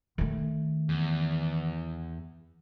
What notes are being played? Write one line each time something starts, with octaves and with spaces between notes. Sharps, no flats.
D#3 A3
E2